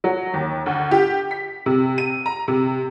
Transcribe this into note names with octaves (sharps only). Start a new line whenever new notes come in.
F#3
D#2
D2
G4
B6
C3
D#7
A#5
C3